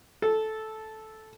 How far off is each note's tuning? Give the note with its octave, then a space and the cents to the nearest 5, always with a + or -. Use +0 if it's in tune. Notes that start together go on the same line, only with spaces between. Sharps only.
A4 -10